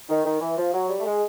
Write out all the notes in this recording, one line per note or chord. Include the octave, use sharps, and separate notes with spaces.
D#3
D#3
E3
F3
F#3
G3
A3
G#3